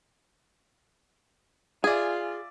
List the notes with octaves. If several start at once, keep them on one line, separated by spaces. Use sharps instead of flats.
F4 G#4 D5 E5 G#5